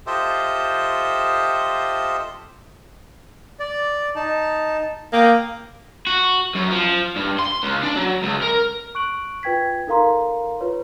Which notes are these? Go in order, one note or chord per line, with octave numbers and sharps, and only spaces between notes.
F4 G4 A4 C5 D#5 E5
D5
D#4 A5
A#3 G5 D6 D#6
F#4
F#2
F3
G2
C6
C#2
D4
F#3
C#2
A#4
C#6 F#6 D7 F#7
F4 B4 G5 G#6 B6
D#4 A4 A#4 F5 A#5 C6
F4 B4 C#5